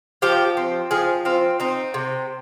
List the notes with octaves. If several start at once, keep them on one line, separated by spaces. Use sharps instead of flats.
F3 G4
C4
F3 G#4
C4 F4
C4 D#4
C3